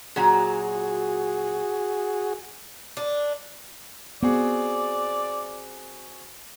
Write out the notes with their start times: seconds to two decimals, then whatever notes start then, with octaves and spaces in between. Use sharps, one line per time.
0.16 A#2 F#3 F#4 G#4 A#5
2.97 D4
4.23 B3 C4 F#4 G#4 D5